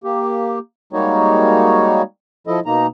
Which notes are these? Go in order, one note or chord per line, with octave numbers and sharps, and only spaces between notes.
A#3 G4
G3 G#3 A#3 D#4 F#4 C#5
F3 E4 A4 D#5
B2 A#3 D#4 A#5